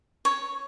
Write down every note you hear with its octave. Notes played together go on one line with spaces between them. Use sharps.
C#5